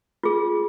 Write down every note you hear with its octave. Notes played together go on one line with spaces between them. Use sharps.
F4 G#4